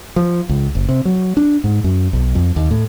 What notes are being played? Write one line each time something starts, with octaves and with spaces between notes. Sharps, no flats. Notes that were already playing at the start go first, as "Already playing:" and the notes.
F3
C#2
F#1
C3
F#3
D4
G#2
F#2
B1
F2
D#2
A2